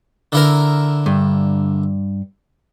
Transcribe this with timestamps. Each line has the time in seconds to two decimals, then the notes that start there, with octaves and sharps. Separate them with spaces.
0.32 D3 E4 A#4
1.06 G2